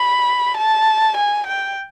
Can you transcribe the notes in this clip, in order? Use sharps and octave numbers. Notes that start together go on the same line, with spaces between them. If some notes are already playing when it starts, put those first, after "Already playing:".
Already playing: B5
A5
G#5
G5